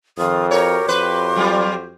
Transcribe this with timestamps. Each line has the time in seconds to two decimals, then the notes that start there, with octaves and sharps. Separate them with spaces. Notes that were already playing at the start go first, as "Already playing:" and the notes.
0.18 F2 D#3 F4 D#6
0.51 F#4 G4 A#4 C#5
0.89 F2 B4 C6
1.36 F#3 G3 F4